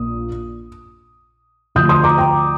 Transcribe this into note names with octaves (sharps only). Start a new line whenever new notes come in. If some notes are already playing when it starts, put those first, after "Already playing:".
Already playing: A#1 A#2 A#3 D#6
D2 D3 F3 D#6 G6
C6 D#6
A#5 D6
G5 A#5